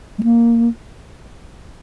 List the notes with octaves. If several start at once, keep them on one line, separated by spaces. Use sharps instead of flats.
G#3
A#3